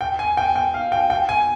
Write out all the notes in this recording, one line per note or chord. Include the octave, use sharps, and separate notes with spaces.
G5
G#5
G5
G5
F5
G5
G5
G#5